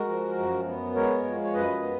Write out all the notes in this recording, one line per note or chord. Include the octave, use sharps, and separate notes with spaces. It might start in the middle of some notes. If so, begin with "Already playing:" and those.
Already playing: G#3 F#4 A#4
F3
F#2
B3
G#3 A#4 C#5
F3
C#5
F#2 B4 D#5
B3